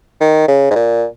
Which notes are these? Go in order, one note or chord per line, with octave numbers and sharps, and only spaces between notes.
D#3
C#3
G#2
A#2